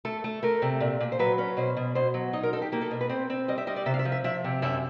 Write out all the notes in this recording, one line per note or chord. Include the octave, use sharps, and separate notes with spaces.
A3 A4
A3
A3 A#4
C3
A#2
A#2
C5
F#3 B4
C#4
B2 C5
B2
B2 C5
F#3
D#4 D#5
A#4
D#4 A4
G4
A#3 G4
A4
B2 A#4
B4
C4 C5
C4
G3 D#5
E5
G3 D#5
D5
C3 E5
F5
E5
F3
E5
F3 E5
C3
F#2 E5